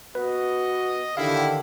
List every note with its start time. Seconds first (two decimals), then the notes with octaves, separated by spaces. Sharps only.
0.15 B3 F#4 B4 D#5
1.17 D3 D#3 E4 G4 F5